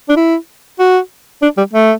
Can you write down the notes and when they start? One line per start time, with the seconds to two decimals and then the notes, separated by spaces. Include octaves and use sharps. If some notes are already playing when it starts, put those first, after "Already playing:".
0.09 D4
0.16 E4
0.79 F#4
1.42 D4
1.57 G3
1.73 A3